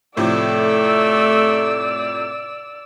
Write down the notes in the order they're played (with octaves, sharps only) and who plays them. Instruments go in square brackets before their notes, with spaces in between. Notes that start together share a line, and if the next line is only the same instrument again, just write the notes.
[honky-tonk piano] A2 C3 F3 [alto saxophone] A3 [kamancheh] D5 E6